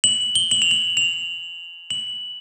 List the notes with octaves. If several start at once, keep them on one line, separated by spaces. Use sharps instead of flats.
F#7
G7
F#7
F7
F#7
F7
F#7